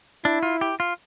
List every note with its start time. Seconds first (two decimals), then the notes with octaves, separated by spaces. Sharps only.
0.25 D4 E4
0.43 F4
0.61 G4
0.80 F4